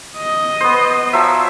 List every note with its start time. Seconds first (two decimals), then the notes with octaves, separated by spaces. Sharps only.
0.17 D#5
0.61 B3 C5
1.13 F3 F#3 E5